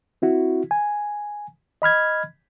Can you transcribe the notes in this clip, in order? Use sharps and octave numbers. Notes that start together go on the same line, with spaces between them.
C4 E4 F#4
G#5
D#5 B5 F6 G#6